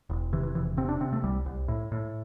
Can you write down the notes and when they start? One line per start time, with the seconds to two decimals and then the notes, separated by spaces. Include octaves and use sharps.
0.10 E1
0.33 C3 E3
0.43 E3
0.55 E1 E3
0.77 C3 C4
0.89 D4
1.00 C3 C4
1.13 A3
1.24 C2 G3
1.46 C2
1.68 A2
1.92 A2